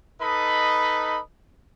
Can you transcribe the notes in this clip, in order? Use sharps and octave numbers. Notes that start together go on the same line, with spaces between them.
D#4 A4 B4 D#5 B5